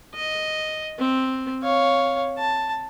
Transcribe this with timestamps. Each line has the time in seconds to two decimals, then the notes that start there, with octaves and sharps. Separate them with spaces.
0.15 D#5
0.99 C4
1.63 C#5 F5
2.38 A5